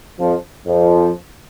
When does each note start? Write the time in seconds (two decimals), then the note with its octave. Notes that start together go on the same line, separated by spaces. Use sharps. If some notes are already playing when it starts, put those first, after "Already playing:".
0.20 F2 F3
0.67 F2 F3